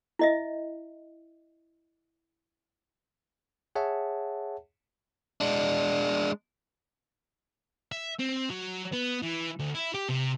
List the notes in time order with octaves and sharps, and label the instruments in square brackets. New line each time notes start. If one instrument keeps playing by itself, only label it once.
[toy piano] E4 D#5 E5
[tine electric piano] G#4 C#5 E5 F#5 A5
[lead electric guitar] G#3 D4
[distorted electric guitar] E5
C4
F#3
B3
E3
D2
E4
G4
C3